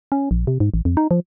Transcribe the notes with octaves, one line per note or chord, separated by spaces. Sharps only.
C#4
A#1
C3
G#2
A1
F2
D#4
F3